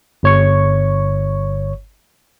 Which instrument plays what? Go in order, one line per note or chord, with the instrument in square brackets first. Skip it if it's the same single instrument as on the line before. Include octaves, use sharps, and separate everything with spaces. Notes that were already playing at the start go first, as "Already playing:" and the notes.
[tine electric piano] G1 C#5 C#6